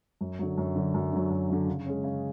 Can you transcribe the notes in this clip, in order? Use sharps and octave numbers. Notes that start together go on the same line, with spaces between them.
F#2
D3 F#3
F#2
D3 F#3
F#2
D3 F#3
F#2
D3 F#3
C#3
G#3 C#4
C#3